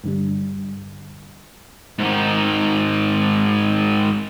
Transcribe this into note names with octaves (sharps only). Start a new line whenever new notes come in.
G2 D3 G3
G#2 D#3